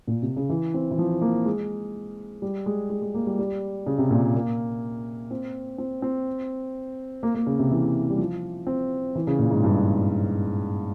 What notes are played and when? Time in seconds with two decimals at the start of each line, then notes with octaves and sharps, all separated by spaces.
0.07 A#2
0.22 C3
0.36 C#3
0.49 E3
0.74 C4
0.91 E3
0.98 F3
1.22 A#3
1.46 G#3
2.42 G3
2.66 G#3
2.90 G#3
3.02 G#3
3.14 A#3
3.27 G3
3.39 G3
3.86 C#3
3.98 C3
4.11 A#2
4.35 A#3
5.31 C4
5.78 C4
6.02 C4
7.23 A#3
7.35 A#3
7.47 C#3
7.59 C3
7.71 E3
8.10 G3
8.19 F3
8.67 C4
9.15 E3
9.27 C#3
9.39 A#2
9.51 G#2
9.64 G2